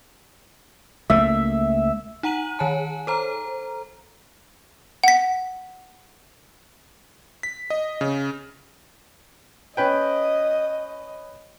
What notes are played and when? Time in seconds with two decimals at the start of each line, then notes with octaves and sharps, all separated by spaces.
1.10 C#2 A3 A#3 E5
2.23 D#4 F#5 A#5 D#7 F#7
2.59 D#3 C#5 G#5 A5
3.07 A4 C5 A#5
5.04 F#5 B6
7.43 B6
7.70 D#5
8.01 C#3
9.77 C#4 B4 D#5 G5